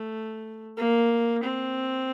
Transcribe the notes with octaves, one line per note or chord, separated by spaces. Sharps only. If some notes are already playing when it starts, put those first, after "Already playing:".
Already playing: A3
A#3
C4